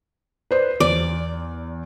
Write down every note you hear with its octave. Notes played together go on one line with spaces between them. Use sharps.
B4 C5 D5
E2 D5